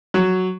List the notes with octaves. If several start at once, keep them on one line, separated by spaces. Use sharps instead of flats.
F#3